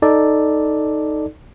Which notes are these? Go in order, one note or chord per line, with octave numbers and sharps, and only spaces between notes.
D#4 A4 D5